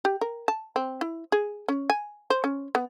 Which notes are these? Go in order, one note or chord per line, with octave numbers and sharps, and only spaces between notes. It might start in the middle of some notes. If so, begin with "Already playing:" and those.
G4
A#4
A5
C4
E4
G#4
C#4
G#5
C5
C#4
B3